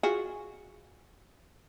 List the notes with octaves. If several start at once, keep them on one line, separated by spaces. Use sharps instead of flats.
F4 F#4 G#4